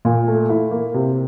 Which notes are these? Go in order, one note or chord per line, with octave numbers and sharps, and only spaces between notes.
A#2
A3
E4
A#3
C3